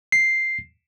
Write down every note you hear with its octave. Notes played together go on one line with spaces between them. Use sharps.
C7